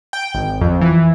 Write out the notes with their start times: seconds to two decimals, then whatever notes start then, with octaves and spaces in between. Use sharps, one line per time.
0.13 G5
0.34 G#1
0.61 F2
0.81 E3